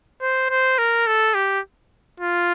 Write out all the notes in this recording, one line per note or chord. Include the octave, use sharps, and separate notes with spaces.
C5
C5
A#4
A4
G4
F4